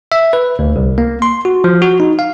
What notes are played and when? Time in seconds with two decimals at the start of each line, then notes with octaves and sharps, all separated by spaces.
0.12 E5
0.33 B4
0.59 D2
0.76 C2
0.98 A#3
1.22 C6
1.45 F#4
1.64 F3
1.82 F#4
2.00 D#4
2.19 F5